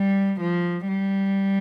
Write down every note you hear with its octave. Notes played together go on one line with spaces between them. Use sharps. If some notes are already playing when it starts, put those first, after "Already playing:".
Already playing: G3
F3
G3